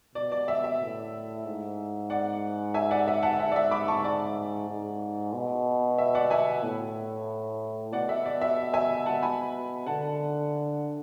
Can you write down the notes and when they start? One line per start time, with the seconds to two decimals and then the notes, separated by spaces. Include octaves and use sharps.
0.15 B2 D5
0.32 D5
0.48 E5
0.64 E5
0.81 A2
1.46 G#2
2.10 D5 F#5
2.74 E5 G#5
2.91 D5 F#5
3.08 E5
3.23 F#5 A5
3.40 G#2 E5
3.51 D5
3.56 E5
3.71 B5 D6
3.88 A5 C#6
4.04 D5
4.69 G#2
5.33 B2
5.98 E5
6.15 D5 F#5
6.30 E5 G#5
6.63 A2
7.92 B2 D5 F#5
8.09 E5
8.25 D5
8.41 E5
8.74 E5 G#5
9.06 F#5 A5
9.23 G#5 B5
9.86 D3 F#5 A5